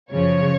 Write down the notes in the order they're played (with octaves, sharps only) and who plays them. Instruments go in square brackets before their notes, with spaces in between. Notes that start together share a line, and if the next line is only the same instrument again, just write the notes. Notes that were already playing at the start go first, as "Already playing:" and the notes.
[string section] F#2 C#3 F3 C#5